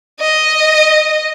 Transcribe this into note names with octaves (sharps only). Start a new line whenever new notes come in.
D#5